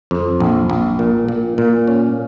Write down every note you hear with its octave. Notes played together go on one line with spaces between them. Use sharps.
F2
A#1
A#1
A#2
A#2
A#2
C#4